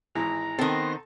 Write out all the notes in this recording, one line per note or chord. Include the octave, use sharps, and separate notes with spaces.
G#1 E3 G#3 A#5
D#3 B3 C4 A4 A5 C6 A#6